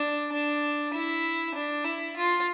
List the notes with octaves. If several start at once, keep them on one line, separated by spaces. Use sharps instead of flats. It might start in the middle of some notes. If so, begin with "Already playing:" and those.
Already playing: D4
D4
E4
D4
E4
F4